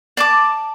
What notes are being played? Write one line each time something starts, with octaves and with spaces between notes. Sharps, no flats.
D5 A5 D6